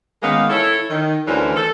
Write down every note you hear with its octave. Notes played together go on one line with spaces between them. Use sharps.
D#3 G#3 A#3 B3 C#4 F5
E4 A4 C#5
D#3
D2 E3 G3 C#4 A#4 C5
A4